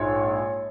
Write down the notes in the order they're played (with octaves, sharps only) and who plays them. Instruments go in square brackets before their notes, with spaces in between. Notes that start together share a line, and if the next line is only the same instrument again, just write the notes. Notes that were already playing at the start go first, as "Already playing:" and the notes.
Already playing: [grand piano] A#1 G#2 F3 G#3 C#5